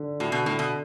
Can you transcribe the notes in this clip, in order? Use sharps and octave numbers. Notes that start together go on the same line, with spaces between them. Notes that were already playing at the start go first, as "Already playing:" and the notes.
Already playing: D3
A2 F#4
B2
A2 D3
B2